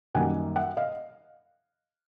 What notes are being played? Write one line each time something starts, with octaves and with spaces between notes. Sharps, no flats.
F#2 D#3 G3 A#3 F#5 G#5
E5 F#5
D#5 F5